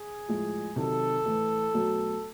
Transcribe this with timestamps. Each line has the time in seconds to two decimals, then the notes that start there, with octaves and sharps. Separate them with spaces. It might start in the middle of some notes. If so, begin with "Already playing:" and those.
Already playing: G#4
0.28 A2 F3 G#3
0.76 C3 D#3 F#3 A4
1.25 A2 E3 A3
1.74 B2 F#3 A3